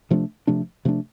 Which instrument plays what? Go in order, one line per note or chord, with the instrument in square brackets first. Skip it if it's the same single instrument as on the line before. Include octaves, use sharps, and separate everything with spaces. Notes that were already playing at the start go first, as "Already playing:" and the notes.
[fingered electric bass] C3 F3 A3 D4
C3 F3 A3 D4
C3 F3 A3 D4